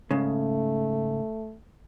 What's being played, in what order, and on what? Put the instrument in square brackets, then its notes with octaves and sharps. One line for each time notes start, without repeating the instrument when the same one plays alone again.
[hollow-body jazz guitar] G#2 C#3 [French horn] A3